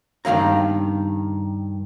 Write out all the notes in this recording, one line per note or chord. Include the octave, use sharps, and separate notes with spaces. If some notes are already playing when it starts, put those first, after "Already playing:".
G2 D#3 G#3 F5 A#5